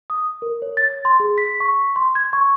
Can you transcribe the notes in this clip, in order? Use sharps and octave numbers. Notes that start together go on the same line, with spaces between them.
D#6
A#4
C#5
A6
C6
G#4
B6
C#6
C6
G#6
C#6